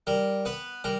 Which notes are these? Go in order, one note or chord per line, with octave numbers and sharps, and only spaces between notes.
G3 A#4
B3 B4
G3 A#4